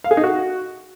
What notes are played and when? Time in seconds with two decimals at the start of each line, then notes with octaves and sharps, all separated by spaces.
0.04 F5
0.11 G#4
0.17 D#4
0.24 F#4